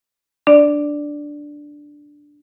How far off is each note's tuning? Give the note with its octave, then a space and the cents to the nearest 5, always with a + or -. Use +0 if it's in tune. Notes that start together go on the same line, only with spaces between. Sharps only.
D4 +0 D5 +0